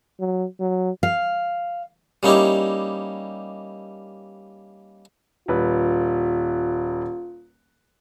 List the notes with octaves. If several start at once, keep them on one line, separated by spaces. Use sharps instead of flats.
F#3
F#3
F5
G3 A#3 C#4 D#4 E4 G4
D#1 F4 B4